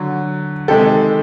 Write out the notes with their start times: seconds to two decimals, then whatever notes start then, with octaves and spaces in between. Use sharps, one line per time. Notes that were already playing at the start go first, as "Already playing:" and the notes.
Already playing: D3 F#3
0.68 C3 D#3 G#3 G4 A4